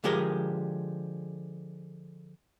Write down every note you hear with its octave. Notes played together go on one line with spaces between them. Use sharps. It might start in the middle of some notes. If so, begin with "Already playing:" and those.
D3 F3 G#3 G4 G#4 A#4